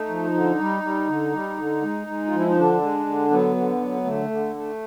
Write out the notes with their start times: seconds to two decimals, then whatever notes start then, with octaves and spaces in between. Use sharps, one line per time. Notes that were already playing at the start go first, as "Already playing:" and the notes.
Already playing: A3 D#4
0.09 F3
0.34 D3
0.59 G3
0.83 G3
1.07 D3
1.33 G3
1.58 D3
1.82 G#3
2.07 G#3
2.26 F4
2.32 F3 E4
2.47 D#4
2.56 D3 D4
2.81 G#3
3.07 D3
3.30 F#3 B3
3.56 D3
3.81 F#3
4.05 D3 A3
4.30 D3
4.55 A3